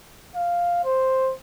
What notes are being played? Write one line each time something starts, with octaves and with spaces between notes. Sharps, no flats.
F5
C5